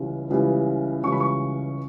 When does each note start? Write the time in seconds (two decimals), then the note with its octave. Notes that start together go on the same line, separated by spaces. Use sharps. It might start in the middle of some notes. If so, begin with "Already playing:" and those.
Already playing: C#2 C#3 E3 G3
0.30 C#2 C#3 E3 G3
1.04 C#2 C#3 E3 G3 C#6
1.12 B5
1.20 C#6